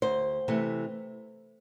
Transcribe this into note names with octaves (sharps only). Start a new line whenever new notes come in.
D2 C5
C3 E3 A3